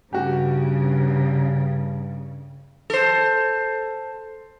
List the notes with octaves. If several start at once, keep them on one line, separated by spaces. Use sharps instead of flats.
G2 C#3 F#4 G4
A4 C5